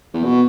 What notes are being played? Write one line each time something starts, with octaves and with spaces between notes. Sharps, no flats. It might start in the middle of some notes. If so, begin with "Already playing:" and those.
E2
B2